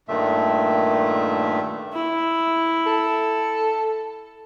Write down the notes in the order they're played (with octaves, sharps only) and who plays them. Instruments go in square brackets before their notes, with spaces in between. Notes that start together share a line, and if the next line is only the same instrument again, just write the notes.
[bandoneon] G2 A#2 D#3 A3 E5
[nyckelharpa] E4
[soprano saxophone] A4